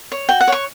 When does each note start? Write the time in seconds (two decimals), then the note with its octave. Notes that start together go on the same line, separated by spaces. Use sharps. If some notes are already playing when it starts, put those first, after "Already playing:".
0.12 C#5
0.29 F#4 G5
0.41 F#5
0.47 C#5 C#6